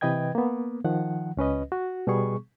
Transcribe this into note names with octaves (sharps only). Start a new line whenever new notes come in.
C3 E3 B4 D#5 G5 G#6
A#3 B3
D#3 F3 F#5
C#2 C#4 B4 D#5
F#4
B2 G3 B3 G#4 C#6